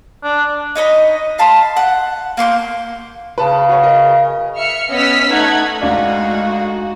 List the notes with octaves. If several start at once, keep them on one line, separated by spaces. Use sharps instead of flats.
D4
D#4 C#5 D#5 B5
F5 A5 B5 C6
F#5
A#3 C6 C#6 G6
C#3 B4 A5
F#4 C#5
A#4 D#5
E5 F6 C#7
B3 C#4 D#5 E6 F6 B6
A3 D#4 F#5 G#6
D2 G#3 D#4 F#4 G#4 D5 F5